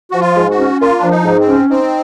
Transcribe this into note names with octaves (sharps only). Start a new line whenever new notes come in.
F3 F#4
F4
G#2
F#4
C#4
A#3 F4
F3 D4
D#4
G#2
C4
C#4
C4 D#4